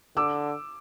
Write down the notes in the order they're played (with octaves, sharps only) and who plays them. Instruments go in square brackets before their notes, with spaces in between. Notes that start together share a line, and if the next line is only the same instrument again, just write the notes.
[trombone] D3 [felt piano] D6 E6